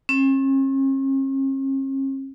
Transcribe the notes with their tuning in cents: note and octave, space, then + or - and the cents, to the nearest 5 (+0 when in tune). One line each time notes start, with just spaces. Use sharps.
C#4 -45